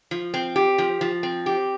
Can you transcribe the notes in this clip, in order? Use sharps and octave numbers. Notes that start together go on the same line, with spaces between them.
F3
C4
G4
F3
F3
C4
G4